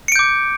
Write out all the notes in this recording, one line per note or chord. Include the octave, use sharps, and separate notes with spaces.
D6 G6 C#7 D7